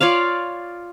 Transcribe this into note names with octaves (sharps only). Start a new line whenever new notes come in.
F4 C#5 D5 F5